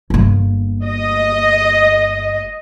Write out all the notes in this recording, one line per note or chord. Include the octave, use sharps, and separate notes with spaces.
G1 A#3
D#5